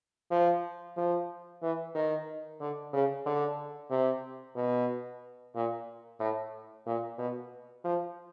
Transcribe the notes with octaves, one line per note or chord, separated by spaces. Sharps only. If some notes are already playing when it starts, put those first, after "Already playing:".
F3
F3
E3
D#3
D3
C#3
D3
C3
B2
A#2
A2
A#2
B2
F3